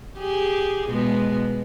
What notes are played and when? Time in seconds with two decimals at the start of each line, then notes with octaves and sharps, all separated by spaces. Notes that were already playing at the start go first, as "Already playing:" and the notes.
0.19 G4 G#4
0.87 B2 G#3 B3